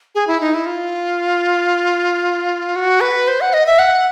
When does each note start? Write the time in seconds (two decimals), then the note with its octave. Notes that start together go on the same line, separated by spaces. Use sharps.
0.15 G#4
0.27 E4
0.40 D#4
0.54 E4
0.66 F4
2.76 F#4
3.01 B4
3.28 C5
3.41 F#5
3.54 D#5
3.66 E5
3.79 F#5